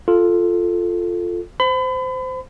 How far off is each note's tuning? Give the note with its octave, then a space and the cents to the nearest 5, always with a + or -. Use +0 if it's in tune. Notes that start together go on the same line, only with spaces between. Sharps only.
F4 +0 A4 +0
C5 -15 B5 +35